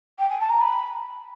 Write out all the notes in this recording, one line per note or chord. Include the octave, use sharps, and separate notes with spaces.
G5
G#5
A5
A#5
B5